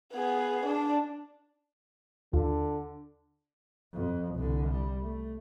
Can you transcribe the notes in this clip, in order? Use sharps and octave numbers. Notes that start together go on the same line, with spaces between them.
B3 G#4
D4
D#2 D3 F4
F2
C2 D3
G3
A3